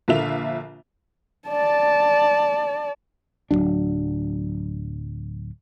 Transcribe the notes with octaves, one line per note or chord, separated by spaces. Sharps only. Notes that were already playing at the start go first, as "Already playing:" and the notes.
A#1 D3 F3 F4 E5 F7
D5 A5
D1 C#2 F#3 D4